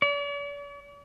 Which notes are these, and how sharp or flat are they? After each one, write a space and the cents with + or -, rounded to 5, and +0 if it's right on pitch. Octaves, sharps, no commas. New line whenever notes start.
D5 -45